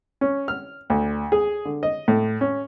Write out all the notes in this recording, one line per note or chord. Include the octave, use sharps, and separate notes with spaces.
C#4
F6
D2
G#4
D3
D#5
A2
C#4